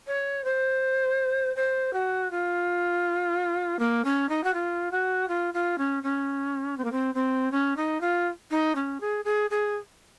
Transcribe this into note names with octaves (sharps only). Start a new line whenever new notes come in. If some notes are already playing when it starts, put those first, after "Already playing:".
C#5
C5
C5
F#4
F4
A#3
C#4
D#4
F#4
F4
F#4
F4
F4
C#4
C#4
C4
A#3
C4
C4
C#4
D#4
F4
D#4
C#4
G#4
G#4
G#4